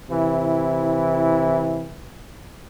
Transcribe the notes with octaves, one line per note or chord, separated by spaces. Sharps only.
C3 E3 E4